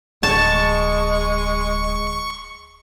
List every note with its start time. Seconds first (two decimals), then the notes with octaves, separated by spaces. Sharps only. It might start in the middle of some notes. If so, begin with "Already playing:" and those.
0.23 D1 G#3 A5 C#6